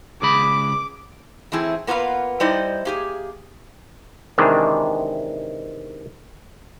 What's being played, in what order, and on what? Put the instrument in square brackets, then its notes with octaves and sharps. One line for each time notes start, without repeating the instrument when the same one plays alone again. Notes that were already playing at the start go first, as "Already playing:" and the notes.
[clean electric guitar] C#2 G#4 B5 [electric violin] D6
[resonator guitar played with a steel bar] E3 A3 C4 E4 G#4
A#3 B3 F4 B4 F5
G3 D#4 E4 C5 D5 D#5
A#3 G4 G#4
[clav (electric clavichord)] C3 D#3 E3 G#3 D4